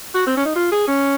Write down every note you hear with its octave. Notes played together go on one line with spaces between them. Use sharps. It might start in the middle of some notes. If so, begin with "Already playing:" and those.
F#4
C4
C#4
D#4
F4
G#4
C#4